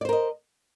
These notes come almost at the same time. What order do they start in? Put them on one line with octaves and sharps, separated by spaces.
D5 C5 A#4 D#5